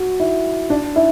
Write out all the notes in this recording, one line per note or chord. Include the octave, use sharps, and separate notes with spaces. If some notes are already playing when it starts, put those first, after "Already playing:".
Already playing: F#4
E4
D4
E4